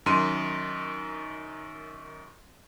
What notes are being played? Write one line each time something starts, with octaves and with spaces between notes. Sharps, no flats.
F#2 D#3 C6 D#7